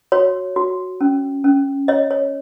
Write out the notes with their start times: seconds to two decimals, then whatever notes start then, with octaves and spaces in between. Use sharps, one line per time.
0.12 F#4 C#5
0.56 F#4
1.01 C#4
1.44 C#4
1.88 C#5 D#5
2.11 C#5